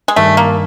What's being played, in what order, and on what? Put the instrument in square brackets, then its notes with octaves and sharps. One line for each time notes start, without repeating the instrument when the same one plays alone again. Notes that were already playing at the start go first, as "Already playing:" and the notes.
[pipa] G#3
[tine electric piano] G2 D#3 G3 [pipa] A3
[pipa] A#3